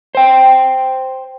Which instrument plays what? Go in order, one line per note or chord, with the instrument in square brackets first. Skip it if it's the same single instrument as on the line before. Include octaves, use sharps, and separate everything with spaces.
[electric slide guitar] C5 G5